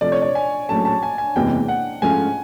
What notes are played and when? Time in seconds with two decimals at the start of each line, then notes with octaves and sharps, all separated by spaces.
0.01 C3 F3 A3 D5
0.12 C#5
0.22 D5
0.35 G#5
0.69 A#1 A2 F#3 A3 C#4 A5
0.85 A5
1.03 G#5
1.18 G#5
1.36 F#1 E2 C3 E3 G#3 G5
1.68 F#5
2.02 G#2 F3 A3 C#4 F4 G#5